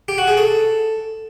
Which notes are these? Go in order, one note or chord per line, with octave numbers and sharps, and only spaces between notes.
G4
F#4
G#4
A4